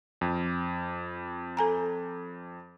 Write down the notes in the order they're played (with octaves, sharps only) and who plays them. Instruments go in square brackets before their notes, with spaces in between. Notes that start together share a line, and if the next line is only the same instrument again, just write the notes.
[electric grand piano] F2
[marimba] A4 G#5 A#5